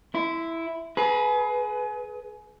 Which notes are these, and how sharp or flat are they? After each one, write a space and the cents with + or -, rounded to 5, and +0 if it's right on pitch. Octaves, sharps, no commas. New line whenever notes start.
E4 +0 C6 -35
G#4 +30 B4 +0 A#5 +40